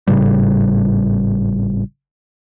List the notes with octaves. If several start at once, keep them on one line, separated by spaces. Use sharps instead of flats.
G#1 A2 C#3 G3